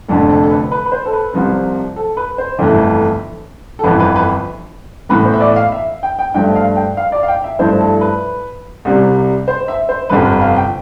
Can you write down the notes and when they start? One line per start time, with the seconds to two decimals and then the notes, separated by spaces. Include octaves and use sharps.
0.09 F1 F2 D3 A4
0.30 A4
0.43 A4
0.51 B4
0.71 B4
0.86 B4
0.92 C5
1.06 A4
1.13 B4
1.33 C2 C3 F3 C4
1.96 A4
2.17 B4
2.38 C5
2.59 G1 F2 E3 A3
3.79 A4
3.84 G1 F2 E3 B4
4.00 B4
4.16 B4
5.09 A2 E3 B3 B4
5.25 C5
5.34 E5
5.41 D5
5.56 F5
5.72 E5
6.03 G5
6.19 G5
6.34 G2 F3 A3 G5
6.55 F5
6.76 G5
6.97 F5
7.12 D5
7.23 F5
7.28 G5
7.44 E5
7.59 G2 F3 A3 E4 C5
7.81 A4
8.01 B4
8.85 C2 C3 G3
9.48 C5
9.68 E5
9.89 C5
10.09 G1 F2 C3 F3 B4
10.25 B4
10.41 F5
10.57 G5